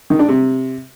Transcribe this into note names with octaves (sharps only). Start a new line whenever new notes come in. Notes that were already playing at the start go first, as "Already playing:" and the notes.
D#3
D4
C3